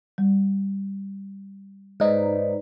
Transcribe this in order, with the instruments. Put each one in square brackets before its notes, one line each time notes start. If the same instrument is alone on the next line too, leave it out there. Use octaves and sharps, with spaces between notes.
[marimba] G3
[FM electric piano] G#2 D#4 [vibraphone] B4 C5 D5